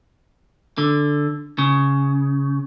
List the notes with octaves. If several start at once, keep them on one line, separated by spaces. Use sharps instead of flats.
D3
C#3